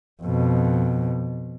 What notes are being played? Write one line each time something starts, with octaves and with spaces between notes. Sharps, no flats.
F2 B2